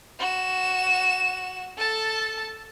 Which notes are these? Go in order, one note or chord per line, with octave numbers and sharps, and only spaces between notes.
F#4 E7
A4 A5